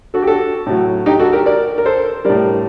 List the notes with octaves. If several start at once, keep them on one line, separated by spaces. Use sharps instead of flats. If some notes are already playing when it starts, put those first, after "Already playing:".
F#4 A4
G4
F#4 A4
A2 F#3
D#4 G4
F#4 A4
G4 A#4
A#4 D5
A#4
A4 C5
A2 G3 A#4 D5